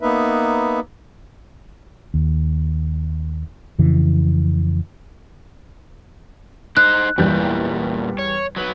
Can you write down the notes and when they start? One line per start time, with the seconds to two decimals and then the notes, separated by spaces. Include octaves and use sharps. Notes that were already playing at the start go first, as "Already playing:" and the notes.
0.01 A#3 B3 D#4 B4 E5
2.14 D#2
3.79 F2 C#3 E3
6.77 D#4 C5 F#6
7.18 E2 A#2 E3 G3 G6
8.19 C#5
8.56 F#3 B4